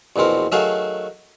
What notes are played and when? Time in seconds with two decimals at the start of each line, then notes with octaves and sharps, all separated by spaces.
0.16 A#1 E2 B2 C4 A#4
0.52 D#3 F#3 A3 F#4 G#4 F5